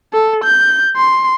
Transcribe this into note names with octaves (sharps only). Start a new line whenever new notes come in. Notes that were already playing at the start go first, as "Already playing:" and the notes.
A4
G6
C6